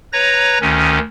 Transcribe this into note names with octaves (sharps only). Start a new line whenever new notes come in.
B4 C#5 A#5 A#6
D2 D#3 C#4